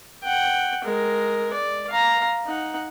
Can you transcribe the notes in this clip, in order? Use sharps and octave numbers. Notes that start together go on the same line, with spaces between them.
F#5 G5
G#3 A#4
D5
F5 A#5
D#4 F#5